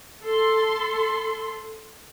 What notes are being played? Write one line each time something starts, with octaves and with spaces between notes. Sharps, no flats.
A4 C6